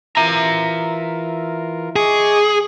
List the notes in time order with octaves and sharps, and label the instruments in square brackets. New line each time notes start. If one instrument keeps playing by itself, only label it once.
[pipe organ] E3 F4 A#4 [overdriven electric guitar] E5 A#5
[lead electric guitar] G#4 [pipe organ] D#5 C#6 D6